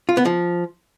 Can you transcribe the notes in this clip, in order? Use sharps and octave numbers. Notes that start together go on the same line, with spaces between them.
F4
B3
F3